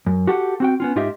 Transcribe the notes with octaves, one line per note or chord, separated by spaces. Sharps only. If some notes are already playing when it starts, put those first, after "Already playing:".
F#2
F#4 G4 A4 F#5
C4 F#4 G5
B3 C#4 F4
G#2 D#4 F4 G4 D#5 E5